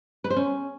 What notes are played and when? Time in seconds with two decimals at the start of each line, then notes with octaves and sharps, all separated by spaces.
0.24 B4
0.30 C5
0.36 C#4